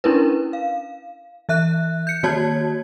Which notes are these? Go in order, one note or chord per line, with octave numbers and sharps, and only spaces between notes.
C#4 D4 E4 A#4 B4
F5
E3 E5 F#6
G6 C#7
D#3 A#3 F#4 C#5 A5 G#6